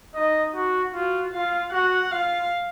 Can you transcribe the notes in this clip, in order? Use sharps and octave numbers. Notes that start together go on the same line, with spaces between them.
D#4 D#5
F#4
F4 F#4
F4 F5
F#4 F#5
F4 F5